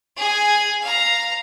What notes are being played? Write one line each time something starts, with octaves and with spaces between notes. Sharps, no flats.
G#4 G#5
F5 A#5